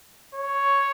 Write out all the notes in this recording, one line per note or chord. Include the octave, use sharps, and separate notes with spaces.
C#5